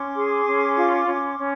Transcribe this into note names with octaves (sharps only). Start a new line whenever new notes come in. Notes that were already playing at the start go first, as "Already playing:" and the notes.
Already playing: C#4 C6 D6
G#4
C#4
F4
C#4
C#4